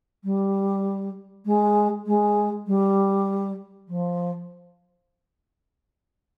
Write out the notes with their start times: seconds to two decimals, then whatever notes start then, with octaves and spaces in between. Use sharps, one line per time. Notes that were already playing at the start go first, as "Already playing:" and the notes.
0.24 G3
1.45 G#3
2.06 G#3
2.67 G3
3.88 F3